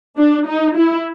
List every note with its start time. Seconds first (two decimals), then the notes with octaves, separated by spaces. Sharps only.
0.18 D4
0.47 D#4
0.77 E4